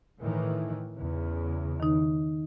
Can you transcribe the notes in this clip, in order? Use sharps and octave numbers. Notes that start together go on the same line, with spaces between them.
A2 D#3 E3
E2 C#3
D#3 D#4